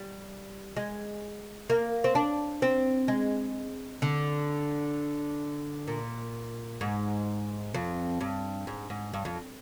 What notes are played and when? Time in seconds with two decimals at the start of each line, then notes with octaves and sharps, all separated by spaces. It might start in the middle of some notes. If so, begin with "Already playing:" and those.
Already playing: G3
0.77 G#3
1.70 A#3
2.04 C4
2.15 D4
2.62 C4
3.08 G#3
4.02 D3
5.88 A#2
6.81 G#2
7.74 F2
8.21 G2
8.67 G#2
8.90 G#2
9.13 G2
9.25 F2